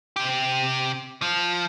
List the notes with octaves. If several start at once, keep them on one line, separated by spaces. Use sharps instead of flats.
C3 G4
F3